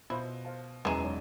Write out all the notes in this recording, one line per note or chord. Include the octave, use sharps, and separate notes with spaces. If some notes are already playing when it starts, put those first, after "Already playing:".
B2 E4 F4 C5
C5 F5 A5
E1 F#2 E3 G#3 A#5 D#7 E7
D#4 C#5 D5